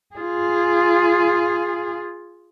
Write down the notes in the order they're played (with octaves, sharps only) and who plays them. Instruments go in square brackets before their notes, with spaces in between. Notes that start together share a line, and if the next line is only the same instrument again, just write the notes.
[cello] F4 G#4